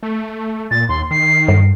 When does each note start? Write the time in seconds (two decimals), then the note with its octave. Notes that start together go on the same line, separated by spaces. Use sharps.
0.03 A3
0.71 A#2 A6
0.89 D#2 C6
1.11 D#3 C7
1.48 G2